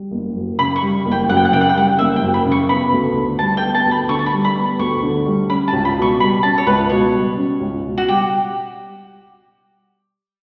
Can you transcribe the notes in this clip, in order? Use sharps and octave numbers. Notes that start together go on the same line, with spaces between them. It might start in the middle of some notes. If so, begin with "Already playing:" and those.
Already playing: G3
F#1
F#2
C#3 B5
C#6
G3
F#1
G5
F#2 F#5
G5
F#5
C#3 G5
F#5
G5
G3 F#5
F#1 E5
G5
F#2
B5
C#3
C#6
B3 B5
D2
D3
G3 A5
G5
B3
A5
D2
B5
D3 C#6
A5
B5
G3
B5
B3
D2 C#6
D3
G3
C#4 B5
A5
C#2
B5
B2
C#6
G3 B5
C#4 A5
C#5
C#2 B4
B2 C#5
G3
C#4
C#2
B2
F#4
G3 G4